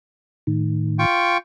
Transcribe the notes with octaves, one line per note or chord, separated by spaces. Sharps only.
A2 D#3
F4 G5 C#6